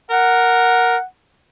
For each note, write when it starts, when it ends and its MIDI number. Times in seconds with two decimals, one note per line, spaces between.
0.11 0.97 70
0.11 1.04 78